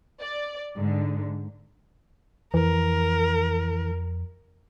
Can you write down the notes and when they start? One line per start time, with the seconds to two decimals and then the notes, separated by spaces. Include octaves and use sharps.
0.22 D5
0.76 G#2 D3
2.54 F2 E3 A#4